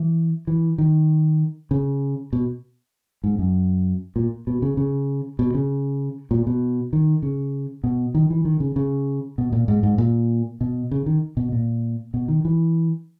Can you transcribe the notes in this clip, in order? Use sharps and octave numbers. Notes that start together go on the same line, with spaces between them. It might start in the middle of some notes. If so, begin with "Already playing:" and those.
Already playing: E3
E3
D#3
C#3
B2
G#2
F#2
A#2
B2
C#3
C#3
B2
C#3
A#2
B2
D#3
C#3
B2
D#3
E3
D#3
C#3
C#3
B2
A#2
G#2
G#2
A#2
B2
C#3
D#3
B2
A#2
B2
D#3
E3